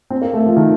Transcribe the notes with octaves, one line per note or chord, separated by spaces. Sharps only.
C4
A#3
A3
F3
D#3